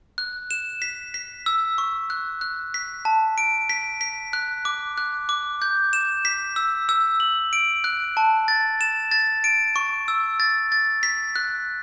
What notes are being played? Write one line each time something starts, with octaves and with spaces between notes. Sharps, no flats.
F#6
E7
B6
B6
E6
C#6
F#6
F#6
B6
A5
D7
B6
B6
F#6
D6
F#6
D6
G6
E7
B6
E6
E6
F#7
D7
F#6
A5
A6
E7
A6
D7
C#6
E6
A6
A6
B6
F#6